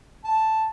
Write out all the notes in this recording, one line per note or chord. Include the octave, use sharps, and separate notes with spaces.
A5